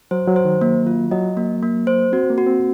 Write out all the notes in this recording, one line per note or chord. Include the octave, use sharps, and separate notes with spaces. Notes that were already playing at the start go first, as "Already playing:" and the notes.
F#3 C5
F#3
C5
D#3
A#3
F4
F#3 D#5
A#3
A#3
C5
C4 F#4
A#3
F#4
C4